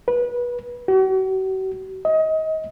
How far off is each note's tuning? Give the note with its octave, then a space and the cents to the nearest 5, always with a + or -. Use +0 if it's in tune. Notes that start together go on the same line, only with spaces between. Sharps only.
B4 -25
F#4 +40
D#5 +25